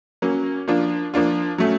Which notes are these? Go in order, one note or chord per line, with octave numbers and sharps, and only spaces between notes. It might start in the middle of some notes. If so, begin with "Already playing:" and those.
F#3 A#3 C#4
F3 A#3 D4 F4
F3 A#3 D4 F4
F#3 A3 C#4